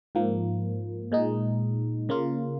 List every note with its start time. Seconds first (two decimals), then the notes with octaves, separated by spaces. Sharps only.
0.15 G#2 F3 A#3
1.12 A#2 G#3 D#4
2.09 C#3 A#3 F4